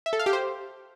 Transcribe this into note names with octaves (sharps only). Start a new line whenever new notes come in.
E5
A4
F5
G4
C5